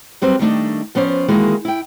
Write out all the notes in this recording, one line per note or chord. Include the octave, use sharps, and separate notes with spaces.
F#3 G3 C4 B4
D#3 G3 A3 D4 D#5
F3 B3 C#4 C5 D5
D#3 E3 G#3 A#3 F#4 G#4
E4 G5